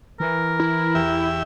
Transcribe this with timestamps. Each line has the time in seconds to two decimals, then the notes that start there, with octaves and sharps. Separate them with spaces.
0.20 E3 A#4
0.60 E4
0.95 E2 G4 E5